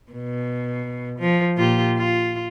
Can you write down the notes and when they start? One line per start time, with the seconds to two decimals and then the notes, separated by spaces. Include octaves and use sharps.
0.12 B2
1.19 F3
1.57 A#2 F4 G4
1.98 F4